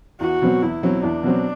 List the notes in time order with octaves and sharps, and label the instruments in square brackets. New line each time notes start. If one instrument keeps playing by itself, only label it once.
[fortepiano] E2 [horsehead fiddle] F#4
[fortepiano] B2 F#3 C4
[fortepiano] E2 [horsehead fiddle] E4
[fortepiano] B2 F#3 C4
[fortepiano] E2 [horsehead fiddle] D4
[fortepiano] B2 F#3 C4